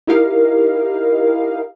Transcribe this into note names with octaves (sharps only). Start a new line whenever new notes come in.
D#4 E4 G4 A#4 D#5 F5